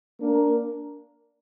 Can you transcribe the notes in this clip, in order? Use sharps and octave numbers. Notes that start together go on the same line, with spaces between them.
A#3 D4 A#4